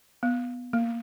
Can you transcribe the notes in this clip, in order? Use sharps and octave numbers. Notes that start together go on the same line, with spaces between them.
B3
A#3